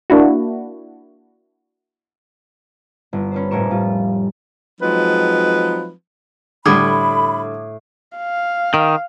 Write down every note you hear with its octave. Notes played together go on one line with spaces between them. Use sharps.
A#3 D4 E4 F#4
G1
C#4 B4 C5
F1 F2 A2 A#4 C#6 E7
A2 G3 F4
F3 F#3 G#3 C4 D#4 B4
A2 D3 G3 B5 D6 D#6 G#6
F5
D#3